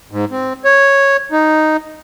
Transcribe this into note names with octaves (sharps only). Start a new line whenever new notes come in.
G#2
C4
C#5
D#4